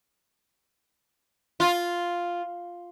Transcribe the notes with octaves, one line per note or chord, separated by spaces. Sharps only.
F4